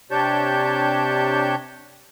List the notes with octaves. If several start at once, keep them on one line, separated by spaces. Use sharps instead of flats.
C3 D4 G4 C#5 A5 G6